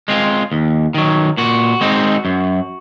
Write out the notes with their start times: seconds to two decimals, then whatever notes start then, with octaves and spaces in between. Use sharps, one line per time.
0.08 G#3 C4 F4
0.52 D#2
0.94 D#3 F#3
1.38 A#2 F#4
1.81 G#3 C4 D#4
2.25 F#2